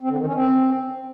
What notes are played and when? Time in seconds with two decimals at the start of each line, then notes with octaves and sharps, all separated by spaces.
0.01 C4
0.09 D3
0.18 D#3
0.27 C#4
0.35 C4